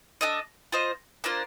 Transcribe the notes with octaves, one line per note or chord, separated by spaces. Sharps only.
D4 A4 D#5
F4 C5 D#5
A#3 D4 F4 C5